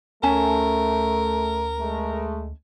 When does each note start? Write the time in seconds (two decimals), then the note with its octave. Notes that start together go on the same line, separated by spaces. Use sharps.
0.23 D2 A3 C#4 A#4 G#5 A5
1.78 G#3 A3